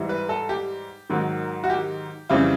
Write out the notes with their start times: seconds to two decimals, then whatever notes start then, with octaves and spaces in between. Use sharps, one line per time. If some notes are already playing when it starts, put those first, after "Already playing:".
Already playing: G#2 E3 G3
0.09 B4
0.29 A4
0.49 G4
1.10 G#2 D#3 F#3
1.64 F#4
1.70 G4
2.29 F2 C#3 E3 G3 F4